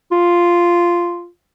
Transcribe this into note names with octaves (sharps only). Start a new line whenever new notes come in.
F4